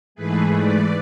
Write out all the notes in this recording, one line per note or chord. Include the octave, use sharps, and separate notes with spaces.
G#2 E3 A3 G#4 B4
B4 D5